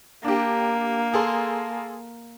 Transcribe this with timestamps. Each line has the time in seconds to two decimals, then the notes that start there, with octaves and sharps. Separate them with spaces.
0.24 A#3 D4 G4
1.14 G#4 A4 C6